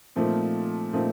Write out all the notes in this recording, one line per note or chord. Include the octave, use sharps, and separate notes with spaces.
A#2 F3 A3 C4 D#4
A#2 F3 A3 C4 D#4